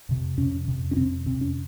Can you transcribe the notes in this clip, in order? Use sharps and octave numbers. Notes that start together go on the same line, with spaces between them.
F2 C3
F2 C3 C#4
F2 C3
C#4
F2 C3 C4
F2 C3 C4
C#4